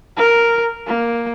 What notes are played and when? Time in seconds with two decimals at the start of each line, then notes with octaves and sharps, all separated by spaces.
0.17 A#4
0.87 A#3